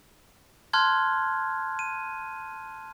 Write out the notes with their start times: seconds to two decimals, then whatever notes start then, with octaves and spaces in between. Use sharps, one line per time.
0.73 A5 C6 F6 F#6 G#6
1.79 D#7